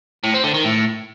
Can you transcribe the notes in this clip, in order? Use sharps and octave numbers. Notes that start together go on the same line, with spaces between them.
A2
C4
D3
D#3
A2